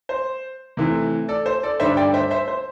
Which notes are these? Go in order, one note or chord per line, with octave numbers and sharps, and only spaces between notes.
C5
C3 E3 A3 E4
A4 D5
C5
A4 D5
G2 D3 G3 D4 C5 E5
D5 G5
C5 E5
C5 E5
C5